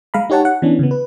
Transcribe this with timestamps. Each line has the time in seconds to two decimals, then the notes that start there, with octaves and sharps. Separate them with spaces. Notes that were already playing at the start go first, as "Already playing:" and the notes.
0.14 G#3 F5 A#5 B5
0.30 D#4 G4 C#5 F#5 A5
0.45 F#5
0.62 E3 B3 C#4 D4
0.79 C#3 B3
0.91 B4